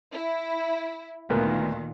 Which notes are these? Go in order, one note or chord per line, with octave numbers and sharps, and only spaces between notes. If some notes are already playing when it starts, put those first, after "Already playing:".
E4
D2 A#2 D#3 B3 A#4